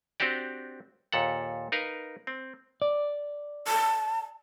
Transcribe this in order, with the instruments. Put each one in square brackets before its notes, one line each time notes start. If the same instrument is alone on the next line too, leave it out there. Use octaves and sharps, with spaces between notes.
[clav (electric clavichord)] C4 D4 F#4 G4 D5
D#2 A#2 A4 F#5
D#4 A#4 B4 F5
C4
[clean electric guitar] D5
[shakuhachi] A5